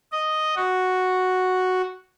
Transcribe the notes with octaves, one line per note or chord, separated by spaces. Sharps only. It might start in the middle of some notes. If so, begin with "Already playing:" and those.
D#5
F#4